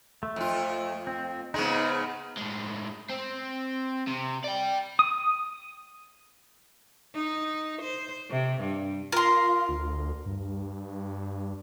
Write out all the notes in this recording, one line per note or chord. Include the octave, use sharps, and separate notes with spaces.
A3
F2 F4
C4
G#2 C#3 G#3 B3 D#4
A2 G#3
C4
C3
D5 G5
D#6
D#4
C5
C3
G2
F4 A#4 C6
D2
G2